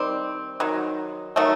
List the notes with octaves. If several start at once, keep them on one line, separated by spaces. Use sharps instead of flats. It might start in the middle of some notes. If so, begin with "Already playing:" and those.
Already playing: D#3 G3 C4
D#3 F#3
D#3 F#3 A3